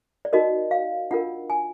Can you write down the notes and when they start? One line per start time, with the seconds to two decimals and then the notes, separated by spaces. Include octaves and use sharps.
0.25 D5
0.33 D#4 F#4 A#4 D#5
0.71 F5
1.11 D4 F4 A#4 F#5
1.50 G#5